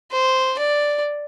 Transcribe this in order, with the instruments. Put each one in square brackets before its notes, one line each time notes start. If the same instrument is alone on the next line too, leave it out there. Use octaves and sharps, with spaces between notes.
[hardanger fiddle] C5
D5